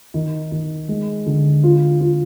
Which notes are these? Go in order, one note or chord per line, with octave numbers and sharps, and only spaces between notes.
D#3
D#3
G#3
D3
F4
F4